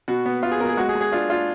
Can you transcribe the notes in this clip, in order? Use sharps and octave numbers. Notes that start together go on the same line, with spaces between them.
B2 F#4
B3
B3 F4
G#4
B2 A#4
G#4
G#3 F#4
G#4
G#3
G#4
D4 F4
D4 F4